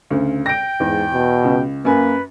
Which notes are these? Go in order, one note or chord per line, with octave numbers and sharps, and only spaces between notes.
D2 C#3
G5 A#6 D7
E2 G#2
B2
C#2
F#2 A#3 B4 G#5